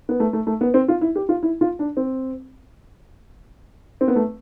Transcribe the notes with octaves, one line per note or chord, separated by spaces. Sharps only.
B3
A3
A3
A3
B3
C4
F4
E4
G4
F4
E4
F4
D4
C4
C4
B3
A3